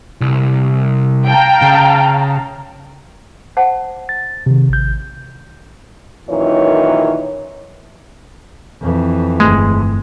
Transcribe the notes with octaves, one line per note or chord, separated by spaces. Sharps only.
C2
F5 G5 A5 A#5
C#3
C5 F#5 A5
A6
C3 D#3
A1 G6
F#2 A#2 D#3 E3 E4 C#5
F2 E3
G1 G#3 A3